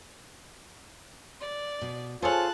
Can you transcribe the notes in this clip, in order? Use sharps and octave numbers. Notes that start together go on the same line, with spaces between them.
D5
B2
F4 G#4 A4 C5 C#5 G#5 A5 F#6